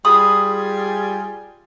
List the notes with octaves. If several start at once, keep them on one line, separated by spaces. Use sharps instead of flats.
G3 F4 G#4 B5 D#6